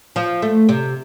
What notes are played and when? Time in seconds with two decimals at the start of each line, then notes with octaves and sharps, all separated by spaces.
0.16 F3
0.42 A3
0.69 C3